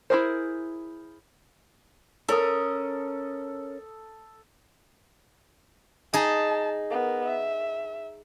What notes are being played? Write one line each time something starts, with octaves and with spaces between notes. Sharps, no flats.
E4 F4 G#4 A#4 C5
C#4 A4 A#4 D#6
D#4 G#4 A5
B3 A#4
E5